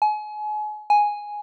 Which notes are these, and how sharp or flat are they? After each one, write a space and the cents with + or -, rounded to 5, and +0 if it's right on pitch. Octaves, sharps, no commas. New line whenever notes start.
G#5 +35
G#5 +0